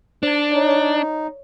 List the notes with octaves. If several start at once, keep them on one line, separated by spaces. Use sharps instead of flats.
D4 D#4 C5
D#4 C#5 D5
C#5 D5 C#6